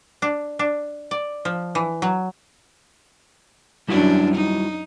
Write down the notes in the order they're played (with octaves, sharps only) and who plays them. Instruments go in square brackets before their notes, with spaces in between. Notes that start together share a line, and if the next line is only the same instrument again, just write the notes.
[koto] D4
D4
D5
F3
E3
F#3
[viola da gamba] F#2 D4 [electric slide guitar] G3 E4 F#4
[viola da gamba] D#4